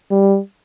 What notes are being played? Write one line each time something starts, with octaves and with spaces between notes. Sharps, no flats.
G3